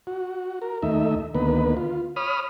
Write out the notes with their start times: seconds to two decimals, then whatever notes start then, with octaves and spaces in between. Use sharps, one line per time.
0.07 F#4
0.62 A#4
0.82 D#2 A3 D#4 E5
1.35 D2 D#3 A#3 B3 B4
1.77 F4
2.16 C#5 B5 D#6 F6